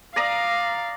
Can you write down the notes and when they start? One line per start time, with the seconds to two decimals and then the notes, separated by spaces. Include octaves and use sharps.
0.16 D5 F5 A#5 D#6